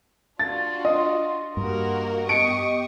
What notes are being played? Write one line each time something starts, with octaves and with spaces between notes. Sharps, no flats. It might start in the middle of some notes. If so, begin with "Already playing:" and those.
D4 F4 F#4 A6
D#5 C6
G2 A#3 F#4 A#4
B3 G4 D#5 C#6 D#6 C#7 D7